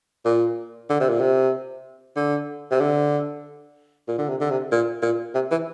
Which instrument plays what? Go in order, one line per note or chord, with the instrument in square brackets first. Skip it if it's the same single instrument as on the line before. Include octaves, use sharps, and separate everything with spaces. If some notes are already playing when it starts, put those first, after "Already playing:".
[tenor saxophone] A#2
D3
C3
A#2
C3
D3
C3
D3
A#2
D3
C3
D3
C3
A#2
A#2
C3
E3